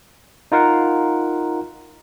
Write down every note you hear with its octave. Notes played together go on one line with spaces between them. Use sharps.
D#4 F4 A#4 F5 F#5